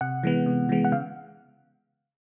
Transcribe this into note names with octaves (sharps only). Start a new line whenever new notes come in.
C3 F#5
E3 G#3 B3
C3
E3 G#3 B3
F#5
C#3 F5